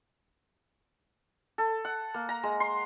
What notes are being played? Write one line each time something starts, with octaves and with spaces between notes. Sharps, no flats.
A4
F#5
A#3
A#5
G#3
C6